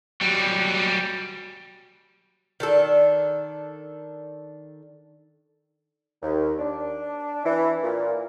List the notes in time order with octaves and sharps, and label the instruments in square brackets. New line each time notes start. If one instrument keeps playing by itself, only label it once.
[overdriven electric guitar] F#3 G3
[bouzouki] D#3 D4 A4
[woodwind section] D#2
D4
E3
A#2